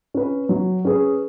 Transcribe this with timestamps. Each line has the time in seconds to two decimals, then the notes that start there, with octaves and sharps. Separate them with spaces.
0.14 C#4 B4
0.49 F#3
0.85 C#4 G#4 B4